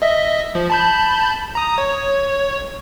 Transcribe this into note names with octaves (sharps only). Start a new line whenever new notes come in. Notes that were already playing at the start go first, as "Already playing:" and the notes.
D#5 E5
F3
A5 B5 G6
A#5 D#6
C#5